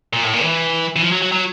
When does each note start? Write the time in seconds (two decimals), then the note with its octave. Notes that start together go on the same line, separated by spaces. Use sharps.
0.13 A#2
0.24 A2
0.33 A#2
0.43 E3
0.96 E3
1.02 F3
1.12 F#3
1.22 F#3
1.32 F#3